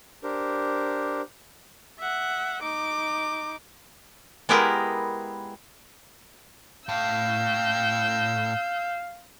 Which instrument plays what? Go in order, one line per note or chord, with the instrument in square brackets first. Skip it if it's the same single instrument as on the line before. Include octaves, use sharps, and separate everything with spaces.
[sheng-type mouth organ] D4 G4 A#4 C5
[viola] E5 F#5
D#4 D6
[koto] G#3 B3 E4 G4 G#4 A#4
[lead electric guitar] A2 [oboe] F5 [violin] E6 G6